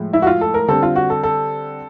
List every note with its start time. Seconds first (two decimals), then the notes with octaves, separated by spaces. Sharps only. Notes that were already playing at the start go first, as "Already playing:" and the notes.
Already playing: A2 F3 G#3
0.13 E4
0.22 F#4
0.27 F4
0.41 A4
0.54 A#4
0.68 D3 G3 C4 A4
0.83 F4
0.96 F#4
1.10 A4
1.23 A4